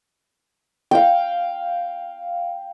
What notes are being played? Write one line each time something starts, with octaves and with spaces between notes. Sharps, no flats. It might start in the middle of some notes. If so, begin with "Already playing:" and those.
F5 G5